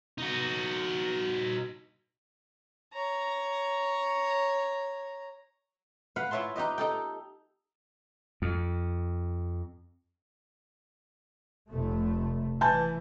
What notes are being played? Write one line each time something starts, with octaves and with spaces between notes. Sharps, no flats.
D#4 F#4
C#5 A#5
B4 F5 F#5
E4 F4 C#5 E5 A5 C6
D#4 G4 B4 D#5
D#4 A4 G5
F2
F1 A3
E3 G#5 A5 G6